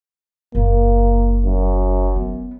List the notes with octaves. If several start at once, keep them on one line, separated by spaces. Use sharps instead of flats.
F#1 A#3
F#2
B3